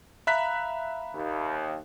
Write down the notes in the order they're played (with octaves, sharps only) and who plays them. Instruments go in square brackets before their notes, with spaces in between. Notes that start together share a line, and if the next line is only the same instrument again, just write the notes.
[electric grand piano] E5 F#6 B6 [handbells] F5 A#5 B5
[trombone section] D#2